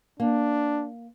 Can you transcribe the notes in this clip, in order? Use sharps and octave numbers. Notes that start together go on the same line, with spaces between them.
A#3 D4